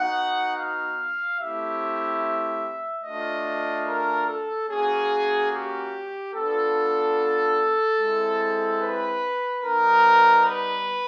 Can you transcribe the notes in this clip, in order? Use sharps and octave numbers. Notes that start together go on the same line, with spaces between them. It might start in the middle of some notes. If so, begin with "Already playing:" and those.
Already playing: B3 D#4 F#4 F#5
F5
A3 C4 E4 G4 E5
A3 D4 F4 D#5
A#4
A4
A#3 C#4 F#4 G#4
G4
B3 D4 F4 A4
G#3 C4 E4
B4
G3 B3 D#4 A#4
B4